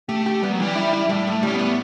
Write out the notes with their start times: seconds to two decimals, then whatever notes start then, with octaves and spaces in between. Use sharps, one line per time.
0.09 A3 G4
0.26 G4
0.42 G3 B3
0.52 F#3
0.60 E3 G3
0.75 E4
0.93 E4
1.09 A2 G3
1.27 A2
1.32 A3
1.43 G3 C#4
1.54 B3
1.59 A2